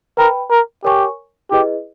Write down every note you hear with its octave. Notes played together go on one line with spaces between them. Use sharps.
A#4 B4 G5 B5
A#4
G4 A#4 C#5 G#5 C#6
E4 G4 G#4 B4 D#5